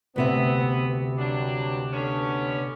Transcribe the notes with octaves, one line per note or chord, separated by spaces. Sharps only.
D2 C3 B3 E5
G2 F#3 D4
D3 B3 C#4